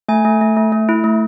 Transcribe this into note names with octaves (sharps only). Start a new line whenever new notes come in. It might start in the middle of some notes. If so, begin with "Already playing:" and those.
A3 G#5
A3
A3
A3
A3
E4
A3